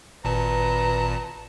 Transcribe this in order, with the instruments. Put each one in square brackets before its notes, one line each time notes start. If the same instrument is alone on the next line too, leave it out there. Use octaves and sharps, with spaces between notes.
[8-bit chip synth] G#1 A#2 A5 [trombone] B4 [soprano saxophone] A#5